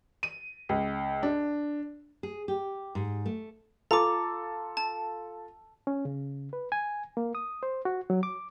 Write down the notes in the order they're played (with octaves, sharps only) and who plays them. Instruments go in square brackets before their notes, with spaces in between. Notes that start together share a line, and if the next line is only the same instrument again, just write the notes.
[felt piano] D#7
C#2
D4
[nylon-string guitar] G#4
G4
G#2
A3
[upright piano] F4 A4 [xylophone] A#5 D6
[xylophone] A5
[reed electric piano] C#4
C#3
B4
G#5
A#3
D#6
C5
F#4
F#3
D6